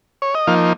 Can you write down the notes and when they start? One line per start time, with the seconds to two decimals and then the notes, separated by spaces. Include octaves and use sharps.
0.22 C#5
0.35 D#5
0.47 F3 A#3 D#4 F5